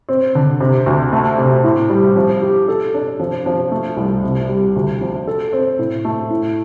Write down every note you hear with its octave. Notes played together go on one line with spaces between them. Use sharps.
C4
D3
C3
D2
A3
C3
A2
G3
F3
G4
A4
D4
F3
F3
A3
C2
C3
G3
D2
F3
A4
C4
A2
A3
A2